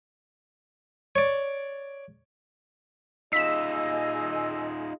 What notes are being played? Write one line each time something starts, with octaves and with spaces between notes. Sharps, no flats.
C#5 D5
D#4 F4 G#4 D#5 E6 B6 E7